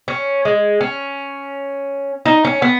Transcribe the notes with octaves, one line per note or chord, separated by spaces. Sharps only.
C#4
G#3
C#4
D#4
C#4
B3